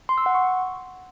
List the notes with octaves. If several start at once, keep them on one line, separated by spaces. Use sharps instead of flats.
C6
E6
F#5
C#6